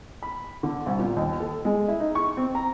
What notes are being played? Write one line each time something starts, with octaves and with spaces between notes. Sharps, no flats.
B5
D3
C2
A#2
D#2
A4
G#3
E4
D#4
C#6
C4
A#5